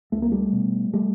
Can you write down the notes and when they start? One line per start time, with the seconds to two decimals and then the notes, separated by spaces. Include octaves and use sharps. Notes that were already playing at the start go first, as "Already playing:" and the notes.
0.12 C#2 A3
0.22 A#3
0.32 G3 A3
0.52 B2
0.93 G3 A3